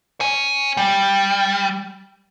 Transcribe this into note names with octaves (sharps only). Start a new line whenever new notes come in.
C#5 G#5
G3